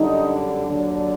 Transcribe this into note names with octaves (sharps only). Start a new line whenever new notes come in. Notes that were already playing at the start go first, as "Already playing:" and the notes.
Already playing: F#2 D3 G3 D#4
D4
D#2 D3 F#3 D4